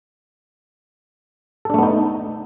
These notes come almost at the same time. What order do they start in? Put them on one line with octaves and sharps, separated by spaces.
A4 D4 A3 B3 D#4